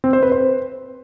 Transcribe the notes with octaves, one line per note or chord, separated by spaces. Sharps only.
C4
C5
B4
C5